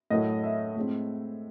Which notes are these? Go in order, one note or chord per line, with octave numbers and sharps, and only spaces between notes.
A2 F#3 A3 D#5
E5
A2 G#3 C4